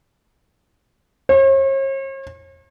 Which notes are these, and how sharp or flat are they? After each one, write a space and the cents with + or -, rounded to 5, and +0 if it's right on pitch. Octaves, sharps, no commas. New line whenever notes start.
C#5 -45